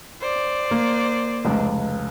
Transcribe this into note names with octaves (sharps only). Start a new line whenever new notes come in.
C5 D5
A#3
F1 C#2